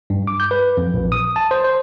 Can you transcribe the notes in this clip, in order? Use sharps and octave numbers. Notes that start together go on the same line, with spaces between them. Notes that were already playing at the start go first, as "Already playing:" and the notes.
G2
D6
G6
B4
F2
A#1
D#6
A5
C5
C5